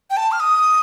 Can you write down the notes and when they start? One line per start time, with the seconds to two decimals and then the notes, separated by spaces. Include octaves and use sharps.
0.10 G5
0.17 A5
0.32 F6
0.40 D#6